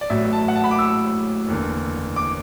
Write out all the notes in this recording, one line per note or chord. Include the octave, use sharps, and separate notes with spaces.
D5
A1 A2 F#3 E5
A5
F#5
A5
B5
D6
E6
F#1 E2 D3
D6